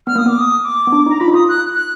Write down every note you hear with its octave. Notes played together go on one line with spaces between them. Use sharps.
B3 F6
A#3 D#6
B3 D6
D#6
D6
B3
D4
D#4
A#5
F4 B5
D#4
F4 D#6
F#6
F#6